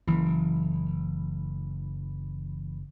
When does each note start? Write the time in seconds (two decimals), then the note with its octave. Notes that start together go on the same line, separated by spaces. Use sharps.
0.08 F#1 E3